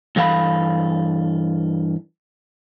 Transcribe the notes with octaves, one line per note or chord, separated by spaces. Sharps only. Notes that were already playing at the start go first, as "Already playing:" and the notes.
G2 E3 A4 F5 F#5 B5